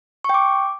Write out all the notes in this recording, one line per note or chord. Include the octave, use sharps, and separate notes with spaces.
G5 C#6 D6